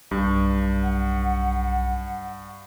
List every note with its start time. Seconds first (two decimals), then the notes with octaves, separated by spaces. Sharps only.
0.11 B1 G2
0.82 F#5